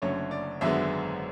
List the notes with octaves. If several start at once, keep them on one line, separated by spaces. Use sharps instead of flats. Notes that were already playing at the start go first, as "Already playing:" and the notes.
F#1 F#2 D3 A3 C#4 C#5
D5
G#1 F#2 D3 G#3 B3 E5